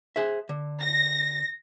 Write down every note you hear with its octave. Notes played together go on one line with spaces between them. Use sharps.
G#4 C5 E5
D3
A#6